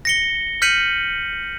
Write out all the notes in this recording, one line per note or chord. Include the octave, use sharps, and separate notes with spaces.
A#6 C#7 G7
F6 G6 B6 C#7 D#7 F#7